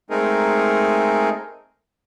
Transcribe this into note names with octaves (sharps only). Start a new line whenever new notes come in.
G#3 A3 C4 D#4 G#4 A#4